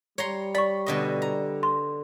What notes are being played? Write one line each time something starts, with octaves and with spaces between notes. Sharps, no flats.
G3 C#5 A#5 C6
D5 B5 C#6
B2 D3 D#5
A#5
C6